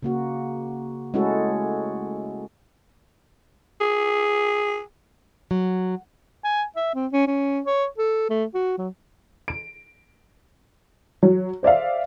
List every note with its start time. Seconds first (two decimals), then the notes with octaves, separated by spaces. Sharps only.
0.03 C#3 A#3 F#4
1.14 G#3 A3 C#4 E4 F#4 A4
3.81 G#4
5.51 F#3
6.44 G#5
6.76 E5
6.94 C4
7.13 C#4
7.27 C#4
7.66 C#5
7.98 A4
8.30 A3
8.54 F#4
8.78 F#3
9.48 D7
11.23 F#3
11.63 C5 D5 E5 F5